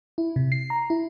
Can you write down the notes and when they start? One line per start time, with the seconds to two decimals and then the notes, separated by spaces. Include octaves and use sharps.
0.18 E4
0.36 C3
0.52 C7
0.70 A#5
0.90 E4